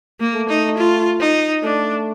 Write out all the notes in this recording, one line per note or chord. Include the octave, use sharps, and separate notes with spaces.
A#3
A3
D#4
F4
D#4
A3 D4